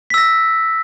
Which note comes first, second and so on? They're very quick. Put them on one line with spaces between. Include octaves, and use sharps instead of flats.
B6 E6 A#6